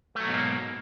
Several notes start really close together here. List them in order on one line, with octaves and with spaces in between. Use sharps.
A3 F#3 B2 G#2 A#3